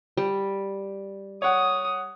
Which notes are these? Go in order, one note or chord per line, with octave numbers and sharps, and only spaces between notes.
G3
C#5 F#5 D#6